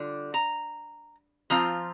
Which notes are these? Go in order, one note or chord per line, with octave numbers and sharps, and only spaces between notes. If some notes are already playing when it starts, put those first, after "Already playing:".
Already playing: D3 G3 D4 F4
A#5
F3 C4 F4 A#5